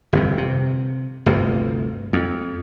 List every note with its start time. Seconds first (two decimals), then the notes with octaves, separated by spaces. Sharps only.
0.13 G1 F2 C3
0.38 C3
1.26 G1 D2 G2 C3
2.13 F2